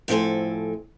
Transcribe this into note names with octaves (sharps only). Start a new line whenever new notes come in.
A2 F3 C4 A4 G#5